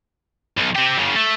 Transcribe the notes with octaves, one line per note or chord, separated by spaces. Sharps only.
B1
C4 G4
F#2 C#3
A3